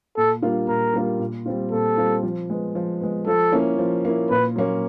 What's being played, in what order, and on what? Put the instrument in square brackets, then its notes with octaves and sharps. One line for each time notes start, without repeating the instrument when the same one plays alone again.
[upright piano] A#2 [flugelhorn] A4
[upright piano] G3 A#3 D4 F4
[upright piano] A#2 [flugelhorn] A#4
[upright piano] G3 A#3 D4 F4
A#2
G3 C4 F4
[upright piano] A#2 [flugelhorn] A4
[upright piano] G3 C4 F4
F3
G#3 B3
F3
G#3 B3
[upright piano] F3 [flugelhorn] A4
[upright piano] A#3 C#4 E4
F3
A#3 C#4 E4
[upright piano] A#2 [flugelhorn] B4
[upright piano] F#3 A#3 C#4